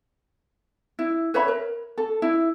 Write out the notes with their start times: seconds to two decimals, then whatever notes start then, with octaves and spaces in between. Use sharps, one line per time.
0.99 E4
1.34 B4 C#5 E5 B5
1.48 A#4
1.98 A4
2.22 E4